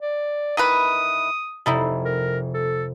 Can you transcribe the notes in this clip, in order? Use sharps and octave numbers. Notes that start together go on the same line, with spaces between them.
D5
D#3 E3 B4 D#6
F1 G3 D#4 E4
A#4
A4